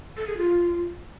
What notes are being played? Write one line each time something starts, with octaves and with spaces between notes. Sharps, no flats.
A4
G#4
F4